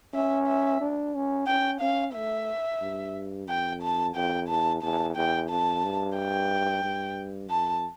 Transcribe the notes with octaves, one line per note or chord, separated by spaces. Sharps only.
C#4 E5
E5
D4
C#4
C#4 G5
C#4 F5
A3 E5
G2
F2 G5
A5
F2 G5
E2 A5
E2 A5
E2 G5
F2 A5
G2
G5
G2
F2 A5